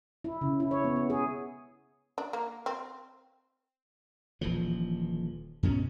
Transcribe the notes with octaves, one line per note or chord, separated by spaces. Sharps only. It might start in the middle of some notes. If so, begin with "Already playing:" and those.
E4
C#3
E4
C#5
B3
B3
G#4
D4
A#3
C4
D#1 E3 F3
G2 B2 C#4